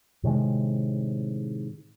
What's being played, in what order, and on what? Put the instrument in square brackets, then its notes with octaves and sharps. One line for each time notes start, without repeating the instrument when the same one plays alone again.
[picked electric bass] A2 C3 D#3 G#3